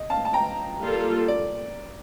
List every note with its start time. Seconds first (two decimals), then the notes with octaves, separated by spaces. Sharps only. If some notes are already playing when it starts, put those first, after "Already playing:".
Already playing: D#5
0.10 F5 A5
0.25 A5
0.33 G5 A#5
0.81 G3 A#3 F4 A4
1.28 D5